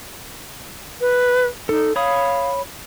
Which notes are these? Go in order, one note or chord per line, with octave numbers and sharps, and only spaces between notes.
B4
D#4 A4
C#5 F5 B5 D#6